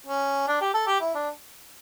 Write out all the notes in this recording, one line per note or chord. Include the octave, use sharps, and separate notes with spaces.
C#4
D4
G4
A4
G4
E4
D4